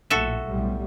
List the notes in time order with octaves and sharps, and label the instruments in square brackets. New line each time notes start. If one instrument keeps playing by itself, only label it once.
[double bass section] A#1 A2 [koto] F#4 A4 E5
[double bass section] B1 A2 G3